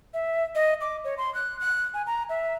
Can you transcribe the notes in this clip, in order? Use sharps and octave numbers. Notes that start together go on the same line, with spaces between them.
E5
D#5
D6
C#5
C6
F#6
F#6
G#5
A#5
E5